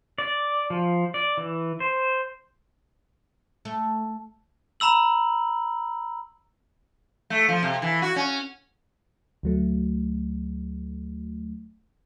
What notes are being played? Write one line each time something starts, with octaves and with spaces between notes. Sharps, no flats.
D5
F3
D5
E3
C5
A3
A#5 B5 E6 F#7
A3
F3
C3
E3
F#4
C#4
D2 F#3 A3